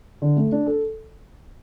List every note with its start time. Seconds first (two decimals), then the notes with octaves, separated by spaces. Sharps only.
0.22 D3
0.37 A3
0.52 D4
0.66 A4